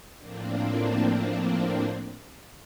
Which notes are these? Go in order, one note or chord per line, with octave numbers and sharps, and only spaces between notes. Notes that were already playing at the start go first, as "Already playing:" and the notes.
A2 F3 A#3 C4 D4